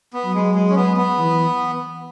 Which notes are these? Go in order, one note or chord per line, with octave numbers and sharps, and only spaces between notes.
B3
F#3
G#3
G#3
C#4
B3
B3
E3